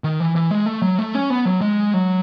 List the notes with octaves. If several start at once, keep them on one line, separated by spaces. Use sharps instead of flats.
D#3
E3
E3
G#3
A3
F#3
A3
C#4
B3
F#3
G#3
F#3